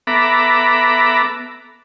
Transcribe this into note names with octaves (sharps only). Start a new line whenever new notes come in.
B3 A4 E5 A#5 B5 D6